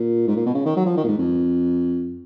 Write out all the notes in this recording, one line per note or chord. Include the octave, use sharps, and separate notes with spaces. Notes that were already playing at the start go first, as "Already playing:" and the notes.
Already playing: A#2
G#2
A#2
B2
C#3
D#3
F#3
F3
D#3
A#2
G#2
F2